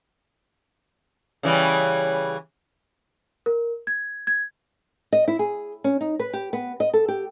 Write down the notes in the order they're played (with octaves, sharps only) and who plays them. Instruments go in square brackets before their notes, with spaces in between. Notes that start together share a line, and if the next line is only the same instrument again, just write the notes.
[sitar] C#3 E3 G3
[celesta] A#4
G#6
G#6
[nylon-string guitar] D#5
E4
G#4
C#4
D#4
B4
G4
B3
D#5
A4
G4